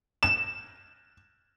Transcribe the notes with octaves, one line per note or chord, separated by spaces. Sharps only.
E7